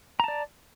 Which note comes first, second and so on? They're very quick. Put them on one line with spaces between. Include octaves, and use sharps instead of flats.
A#5 A5 D5